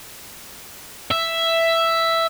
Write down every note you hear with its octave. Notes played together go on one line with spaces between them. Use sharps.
E5